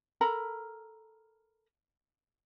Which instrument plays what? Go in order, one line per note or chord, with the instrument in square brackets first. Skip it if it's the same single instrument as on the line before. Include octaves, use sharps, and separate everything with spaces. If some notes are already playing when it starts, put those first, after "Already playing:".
[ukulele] A4 A#4 A#5 B5